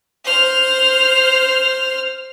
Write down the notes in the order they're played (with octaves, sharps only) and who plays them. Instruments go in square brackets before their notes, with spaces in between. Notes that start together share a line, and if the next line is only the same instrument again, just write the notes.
[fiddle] C5 F6